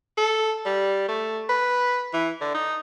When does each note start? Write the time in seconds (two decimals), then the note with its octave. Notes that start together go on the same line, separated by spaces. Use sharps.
0.18 A4
0.66 G3
1.09 A3
1.49 B4
2.14 E3
2.41 D3
2.55 D#4